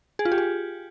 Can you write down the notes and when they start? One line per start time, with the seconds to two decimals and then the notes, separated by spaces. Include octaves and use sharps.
0.19 G#4
0.25 F4
0.32 G4
0.38 G#4